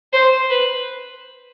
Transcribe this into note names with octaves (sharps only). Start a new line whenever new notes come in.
C5
B4